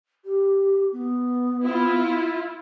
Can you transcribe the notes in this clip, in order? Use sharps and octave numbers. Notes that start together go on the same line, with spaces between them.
G4
B3
E4 F4